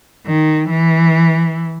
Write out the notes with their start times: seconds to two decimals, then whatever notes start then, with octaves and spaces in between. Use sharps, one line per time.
0.27 D#3
0.69 E3